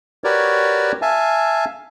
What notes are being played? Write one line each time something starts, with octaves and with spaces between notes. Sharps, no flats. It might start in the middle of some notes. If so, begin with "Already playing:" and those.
F#4 G4 A#4 B4 C#5 D5
E5 F5 G#5 A5